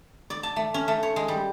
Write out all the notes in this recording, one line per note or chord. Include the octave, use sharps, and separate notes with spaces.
D5
A5
A3
C#4
A3
C#5
G#3
G3